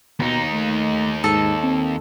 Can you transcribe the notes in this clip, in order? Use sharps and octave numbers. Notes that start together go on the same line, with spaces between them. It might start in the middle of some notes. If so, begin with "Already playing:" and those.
D#2 B2 D#4
A3
G#2 A4
C4